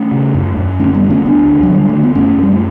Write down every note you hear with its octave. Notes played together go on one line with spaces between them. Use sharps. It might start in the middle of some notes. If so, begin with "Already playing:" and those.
Already playing: A3 C#4
C#3
F#2
F#2
D3 A3 C#4
G3 B3
D3
A3 C#4
D2 B3 D4
D2
F#3
D3
G3
D3 A3
B3
F#2 A3 C#4
F#2
G3
A3